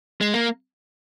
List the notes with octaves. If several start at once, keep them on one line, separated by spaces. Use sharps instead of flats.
G#3
A#3